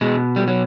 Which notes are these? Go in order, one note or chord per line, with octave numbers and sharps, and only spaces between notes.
B2 G#3
G3
F#3